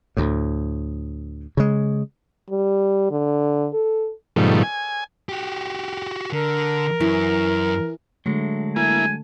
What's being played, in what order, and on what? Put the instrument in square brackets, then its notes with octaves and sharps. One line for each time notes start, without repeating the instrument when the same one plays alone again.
[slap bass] D2 A2
C#3 G#3
[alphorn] G3
D3
A4
[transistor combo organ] G#2 B2 D#3 F3 G3 A3
G#5
[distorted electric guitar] F#4 G4
[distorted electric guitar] D3 [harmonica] A#4
[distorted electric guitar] F#2 [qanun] E3
[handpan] D3 A3 [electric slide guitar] F#3 G#3
[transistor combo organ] A#3 E4 [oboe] G#5